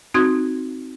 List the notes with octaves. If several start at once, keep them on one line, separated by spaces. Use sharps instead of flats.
C4 D#4 F#4 C6 D#6 G#6